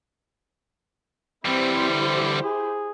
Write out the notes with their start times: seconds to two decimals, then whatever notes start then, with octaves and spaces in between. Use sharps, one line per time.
1.45 E3 G3 C4 E4 G4 C5
1.91 D3
2.43 G#4